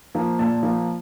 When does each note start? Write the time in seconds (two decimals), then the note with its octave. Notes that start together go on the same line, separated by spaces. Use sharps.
0.15 F3 A#3
0.39 A#2 A5
0.63 F3 A#3